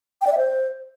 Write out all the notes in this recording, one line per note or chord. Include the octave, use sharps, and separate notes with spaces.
G5
D5
E5
C5